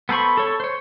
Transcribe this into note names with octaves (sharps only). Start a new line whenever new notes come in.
B3 A4 C5 B5 C#6
A4 C#5
C5 C#5